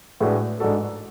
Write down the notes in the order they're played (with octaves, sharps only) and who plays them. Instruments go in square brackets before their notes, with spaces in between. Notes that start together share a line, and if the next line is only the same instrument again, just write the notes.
[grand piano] A2 G#3 D4 F#4 B4
G#2 G#3 D4 F#4 A4